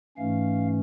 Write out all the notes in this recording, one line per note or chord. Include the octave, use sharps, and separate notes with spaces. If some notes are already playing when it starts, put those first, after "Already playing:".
G#2 E3 A3 C#4 F5